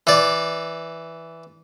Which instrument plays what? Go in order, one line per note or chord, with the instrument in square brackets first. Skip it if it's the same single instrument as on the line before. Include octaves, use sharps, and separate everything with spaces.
[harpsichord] E3 D5